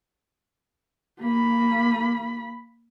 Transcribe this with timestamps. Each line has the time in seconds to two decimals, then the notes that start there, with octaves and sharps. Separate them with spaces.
1.21 A#3 B5